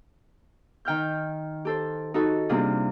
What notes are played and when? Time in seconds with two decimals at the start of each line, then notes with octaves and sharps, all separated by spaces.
0.85 D#3 G5 F6 G6
1.65 G4 A4 C5
2.14 D#4 F#4 A4
2.49 C3 G3 A#3 D4 F4 G#4